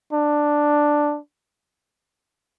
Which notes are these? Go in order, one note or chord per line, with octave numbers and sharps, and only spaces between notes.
D4